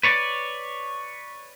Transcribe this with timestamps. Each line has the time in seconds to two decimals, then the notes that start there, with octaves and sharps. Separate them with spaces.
0.03 B4 C#5 D5